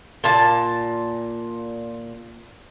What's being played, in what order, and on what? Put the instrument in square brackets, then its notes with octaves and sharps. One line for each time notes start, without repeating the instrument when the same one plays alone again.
[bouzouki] A#2 A5